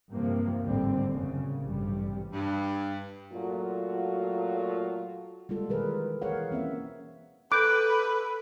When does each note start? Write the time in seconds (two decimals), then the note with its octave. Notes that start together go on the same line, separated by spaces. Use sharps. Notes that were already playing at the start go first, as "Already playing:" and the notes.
0.13 G2 C3 F3 A#3 C4
0.63 G#1 D#2 A2 D3 G3 C4
1.12 F#2 C#3
1.61 A1 G2 C3 G3
2.32 G2
3.33 A#2 F#3 A3 F4 F#4
5.49 G3 G#3 F4 A4
5.69 B2 D#3 E3 G#4 A#4 B4
6.22 E3 G#4 A#4 C#5 F5 F#5
6.51 A#3 C4 C#4 E5
7.52 A4 B4 D6 F#6 G6